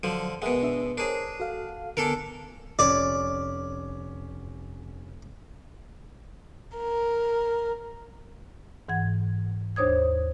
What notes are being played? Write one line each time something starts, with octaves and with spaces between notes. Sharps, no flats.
D3 F3 F#3
B2 G#3 A#4 E5 F#5
D4 E5
D4 G#4 A#4 C5 C#5
F#4 A4 F5
D3 B3 D4 A4 A#4 G#5
F1 C#4 D5
A#4
G#2 E3 F#5 G#6
D#2 D4 C5 C#5 D#6 G#6